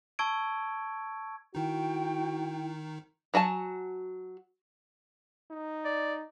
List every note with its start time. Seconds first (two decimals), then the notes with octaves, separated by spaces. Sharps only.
0.19 A5 C#6 E6 G#6 D7
1.55 D#3 D#4 E4 F#4 G5
3.34 F#3 F#4 G#5 A5
5.51 D#4
5.85 D5